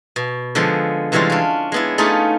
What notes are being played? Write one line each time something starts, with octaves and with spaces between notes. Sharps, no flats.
B2
D3 F3 G#3 B3
C3 E3 G3 G#3 C#4 F4
C#4 D4
G#3 B3 E4
A3 C#4 D#4 F4 G#4